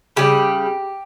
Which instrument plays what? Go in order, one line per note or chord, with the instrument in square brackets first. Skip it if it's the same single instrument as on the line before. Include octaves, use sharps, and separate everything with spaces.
[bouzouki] C#3 G3 G4